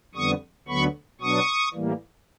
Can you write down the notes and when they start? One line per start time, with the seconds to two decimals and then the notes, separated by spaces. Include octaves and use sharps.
0.15 F2 D3 G3 B3 C#6 D#6
0.68 D2 D3 F#3 B3 B5 C#6
1.21 B2 F#3 B3 D4 C#6 D#6
1.74 A2 E3 G3 A#3